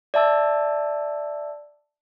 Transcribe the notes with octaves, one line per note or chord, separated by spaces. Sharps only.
D5 E5 A5 E6